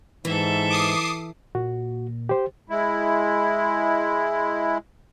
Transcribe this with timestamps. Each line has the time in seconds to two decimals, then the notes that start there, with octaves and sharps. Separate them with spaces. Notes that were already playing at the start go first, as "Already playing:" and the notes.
0.25 G#2 E3 A4 E5
0.70 D6 D#6 C7
1.55 A#2 F#4
2.29 G4 C5
2.70 G#3 E4